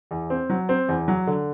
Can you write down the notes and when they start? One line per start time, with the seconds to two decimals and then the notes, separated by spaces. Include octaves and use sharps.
0.11 E2
0.30 C4
0.50 F#3
0.69 C4
0.88 E2
1.08 F#3
1.27 D3